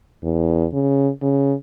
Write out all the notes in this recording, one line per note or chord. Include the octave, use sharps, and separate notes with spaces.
E2
C#3
C#3